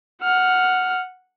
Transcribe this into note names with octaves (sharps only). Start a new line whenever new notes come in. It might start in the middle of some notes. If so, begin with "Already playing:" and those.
F#5 F6